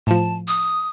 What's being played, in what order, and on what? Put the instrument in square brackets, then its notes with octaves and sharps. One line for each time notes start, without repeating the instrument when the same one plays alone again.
[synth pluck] A2 F3 [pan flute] A5
[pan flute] D#6